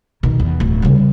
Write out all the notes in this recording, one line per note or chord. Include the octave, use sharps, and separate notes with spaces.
B2 D#3
E2
D1
C#3 G3